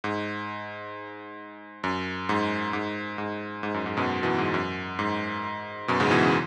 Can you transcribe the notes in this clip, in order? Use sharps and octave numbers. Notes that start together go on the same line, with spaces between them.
G#2
F#2
G#2
G#2
G#2
G#2
F#2
G#2
F#2 B2
B2 E3
G#2
F#2
G#2
F#2 B2
G#2 C#3
B2 E3
C#3